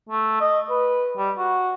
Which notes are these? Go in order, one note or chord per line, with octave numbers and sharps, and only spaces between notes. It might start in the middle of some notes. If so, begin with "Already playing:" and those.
A3
D#5
B4
G3
F#4